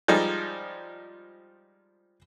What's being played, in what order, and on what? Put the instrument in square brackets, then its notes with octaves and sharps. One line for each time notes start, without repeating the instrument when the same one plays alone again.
[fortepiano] F3 G3 G#3 D#4